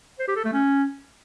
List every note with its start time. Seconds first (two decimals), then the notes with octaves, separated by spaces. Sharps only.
0.19 C5
0.28 G4
0.36 A4
0.45 A3
0.53 C#4